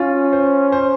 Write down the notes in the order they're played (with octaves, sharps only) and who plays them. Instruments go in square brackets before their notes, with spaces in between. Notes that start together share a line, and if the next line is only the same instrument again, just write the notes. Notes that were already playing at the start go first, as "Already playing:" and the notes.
Already playing: [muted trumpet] C#4 [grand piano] F4
[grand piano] C5
C5